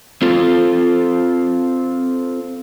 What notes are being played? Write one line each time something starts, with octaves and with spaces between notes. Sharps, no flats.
C4 F4 A4